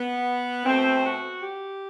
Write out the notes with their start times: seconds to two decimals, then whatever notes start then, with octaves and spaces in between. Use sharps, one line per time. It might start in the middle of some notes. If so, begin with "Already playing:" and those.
Already playing: B3
0.66 B2 A3 C4
1.04 F#4
1.42 G4